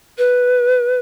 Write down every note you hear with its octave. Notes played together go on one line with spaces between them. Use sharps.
B4